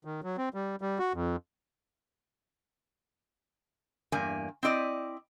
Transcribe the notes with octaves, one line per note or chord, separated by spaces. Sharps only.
D#3
F#3
C4
G3
G3
F#4
F2
E2 G2 A#3 G#5
C4 E4 D5 D#5